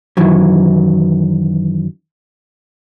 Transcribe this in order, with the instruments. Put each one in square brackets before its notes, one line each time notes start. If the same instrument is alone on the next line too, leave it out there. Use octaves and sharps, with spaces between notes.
[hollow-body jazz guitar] F#2 D#3 E3 F#3